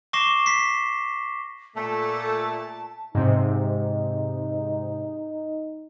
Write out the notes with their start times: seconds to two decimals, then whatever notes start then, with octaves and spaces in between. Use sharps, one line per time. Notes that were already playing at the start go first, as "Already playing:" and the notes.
0.13 C#6 D6 A#6 C7 E7 G7
0.46 B6 C7
1.76 A#2 A3 A5
3.15 G#2 C3 D#4